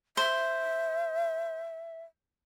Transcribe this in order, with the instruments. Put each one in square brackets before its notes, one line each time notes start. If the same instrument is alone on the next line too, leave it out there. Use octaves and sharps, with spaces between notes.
[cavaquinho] C5 [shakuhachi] E5